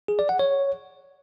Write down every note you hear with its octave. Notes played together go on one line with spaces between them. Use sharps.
G#4
D5
F#5
C#5